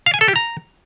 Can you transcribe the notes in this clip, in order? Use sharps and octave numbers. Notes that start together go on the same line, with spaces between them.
F5
G#5
A4
G4
A#5